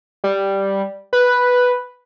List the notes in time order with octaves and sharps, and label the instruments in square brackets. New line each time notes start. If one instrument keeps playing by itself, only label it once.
[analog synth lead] G3
B4